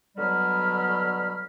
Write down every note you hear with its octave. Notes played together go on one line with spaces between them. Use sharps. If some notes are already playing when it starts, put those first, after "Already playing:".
B2 D3 F#3 G3 B5 F6